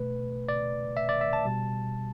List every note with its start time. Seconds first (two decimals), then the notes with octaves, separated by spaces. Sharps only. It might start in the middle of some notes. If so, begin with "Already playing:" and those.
Already playing: B2 A3 B4
0.49 D5
0.97 E5
1.09 D5
1.21 E5
1.33 A5
1.45 B2 G3